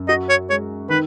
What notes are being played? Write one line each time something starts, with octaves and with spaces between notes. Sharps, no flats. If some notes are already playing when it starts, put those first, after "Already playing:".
Already playing: F#2
F#4 D#5
C#5
G#3 C#5
D#3 B4